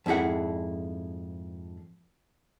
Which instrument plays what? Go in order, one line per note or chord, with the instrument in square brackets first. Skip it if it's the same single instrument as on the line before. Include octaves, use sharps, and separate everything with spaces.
[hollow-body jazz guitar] F2 G#2 E4 G#4 F#5